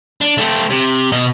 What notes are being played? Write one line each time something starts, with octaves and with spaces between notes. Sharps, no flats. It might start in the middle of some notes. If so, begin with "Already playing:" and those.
D4
A3 C4
C3
B2 D#5